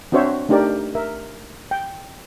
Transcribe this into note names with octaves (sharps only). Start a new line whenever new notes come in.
C4 D4 F#4 C5 C#5 E5
A3 D4 D#4 G4 A#4 D5
A#4 E5
G5